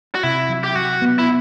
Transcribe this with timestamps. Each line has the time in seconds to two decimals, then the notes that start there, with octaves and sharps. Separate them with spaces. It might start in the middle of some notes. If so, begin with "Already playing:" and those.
0.15 F#4
0.23 C3 E4
0.49 F#3
0.64 G4
0.75 F#3 F#4
1.02 B3
1.19 E4